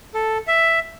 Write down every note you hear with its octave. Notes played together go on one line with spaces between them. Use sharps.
A4
E5